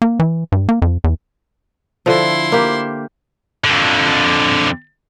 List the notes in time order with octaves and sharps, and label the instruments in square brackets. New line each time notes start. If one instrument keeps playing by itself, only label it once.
[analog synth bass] A#3
E3
G2
A#3
F2
E2
[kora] D3 F3 [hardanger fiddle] E4 C6
[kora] A#3 G4
[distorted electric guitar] F2 D3